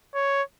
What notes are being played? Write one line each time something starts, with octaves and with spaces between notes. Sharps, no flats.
C#5